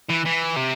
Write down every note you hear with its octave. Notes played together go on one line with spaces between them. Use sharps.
E3
E3
C3